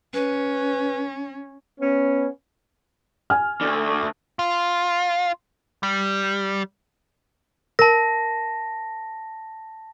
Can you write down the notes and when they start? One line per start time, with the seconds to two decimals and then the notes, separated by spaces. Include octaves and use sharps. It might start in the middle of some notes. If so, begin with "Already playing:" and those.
0.14 C#4 B4
1.81 B3 C#4
3.30 G#5 F6
3.61 D2 D3
4.39 F4
5.83 G3
7.79 A#4 A5 A#6